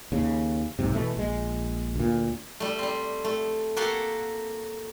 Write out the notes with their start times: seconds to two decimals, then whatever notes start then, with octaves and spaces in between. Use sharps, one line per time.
0.12 D#2 C#3
0.79 B1 G#2 C3
0.95 B2 E3 A3
1.17 A#1 G#3
1.96 D2 A#2
2.60 G3 A3
2.79 G3 C4
3.25 A3
3.76 A#3 F#4 G4 A4 F5 F#5